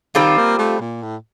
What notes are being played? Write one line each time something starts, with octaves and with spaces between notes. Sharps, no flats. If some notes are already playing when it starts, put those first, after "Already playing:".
D#3 G3 C4 F4 C5
A#3
A3
A#2
A2